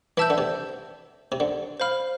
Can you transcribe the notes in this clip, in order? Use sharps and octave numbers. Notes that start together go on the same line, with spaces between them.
E3 E5 A5 E6 G6
D3
C3
C3
D3
C5 F5 B5 F6